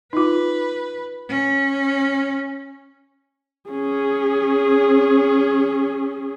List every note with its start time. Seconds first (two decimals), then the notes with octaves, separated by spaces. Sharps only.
0.13 D#4 F4 B4
1.29 C#4
3.69 C#4 G#4